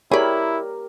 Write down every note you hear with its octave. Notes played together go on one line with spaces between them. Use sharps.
E4 G4 G#4 A#4 C#5 D5 B5